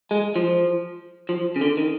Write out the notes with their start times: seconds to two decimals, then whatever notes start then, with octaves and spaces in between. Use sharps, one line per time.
0.11 G#3
0.36 F3
1.29 F3
1.56 C#3
1.61 D3
1.77 D#3